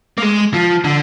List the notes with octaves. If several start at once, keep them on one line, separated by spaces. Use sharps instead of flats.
A#3
G#3
F3
D3